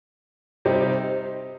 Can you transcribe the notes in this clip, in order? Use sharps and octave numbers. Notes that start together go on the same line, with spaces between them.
C3 G3 C4 D#4 G4